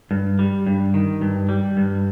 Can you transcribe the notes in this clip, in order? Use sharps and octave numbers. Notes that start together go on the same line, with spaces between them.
G2
G3
G2
D#3
G2
G3
G2